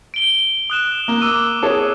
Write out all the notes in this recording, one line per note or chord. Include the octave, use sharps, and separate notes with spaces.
D7 G7
D#6 F#6 E7
A#3
D6 E6 D#7
G#4 C#5 A5